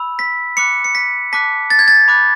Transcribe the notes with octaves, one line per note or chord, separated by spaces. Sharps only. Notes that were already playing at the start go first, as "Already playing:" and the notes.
Already playing: B5 E6
B6
B5 D6 F#6 C#7
C#7
B6
A5 D6 F#6 B6
A6
G#6
A6
B5 D6 F#6